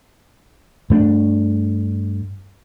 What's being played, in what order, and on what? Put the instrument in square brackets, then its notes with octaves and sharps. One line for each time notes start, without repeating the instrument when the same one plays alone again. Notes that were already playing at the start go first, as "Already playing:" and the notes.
[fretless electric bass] G2 A3 A#3 D4